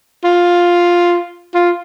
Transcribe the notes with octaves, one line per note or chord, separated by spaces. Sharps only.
F4
F4